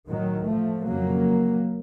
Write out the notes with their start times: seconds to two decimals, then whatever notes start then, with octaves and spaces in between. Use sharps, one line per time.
0.10 A2 D#3 F#3
0.49 F3 A3
0.86 F2 C#3 F#3 A#3